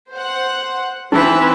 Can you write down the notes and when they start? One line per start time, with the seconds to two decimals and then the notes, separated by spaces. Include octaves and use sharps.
0.12 C5 F#5
1.12 E3 C4 D#4 B4